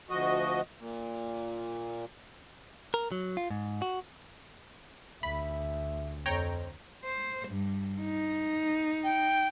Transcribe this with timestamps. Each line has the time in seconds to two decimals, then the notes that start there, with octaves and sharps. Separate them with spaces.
0.10 D2 F3 F#4 D#5
0.78 A#2
2.94 A#4
3.12 F#3
3.37 F4
3.51 G#2
3.82 F#4
5.23 D2 E5 B5
6.26 F2 C4 C#5 G5 A#5
7.04 C5
7.49 G2
8.01 D#4
9.04 G5